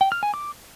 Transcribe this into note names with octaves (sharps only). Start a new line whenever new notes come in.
G5
F6
G#5
D6